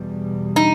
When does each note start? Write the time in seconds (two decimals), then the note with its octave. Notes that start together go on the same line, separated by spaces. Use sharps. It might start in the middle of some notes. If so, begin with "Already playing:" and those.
Already playing: E2 B2 G3
0.56 D#4